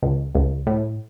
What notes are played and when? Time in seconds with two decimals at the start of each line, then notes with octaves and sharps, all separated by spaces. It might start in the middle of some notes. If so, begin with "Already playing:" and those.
0.03 C#2
0.35 C#2
0.67 A2